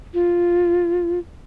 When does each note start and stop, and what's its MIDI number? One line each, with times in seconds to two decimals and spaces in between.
0.14 1.19 65